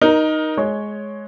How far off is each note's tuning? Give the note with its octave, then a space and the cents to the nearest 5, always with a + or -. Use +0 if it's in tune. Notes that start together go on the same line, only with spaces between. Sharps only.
D#4 +0 A#4 +20
G#3 +15 C#5 +0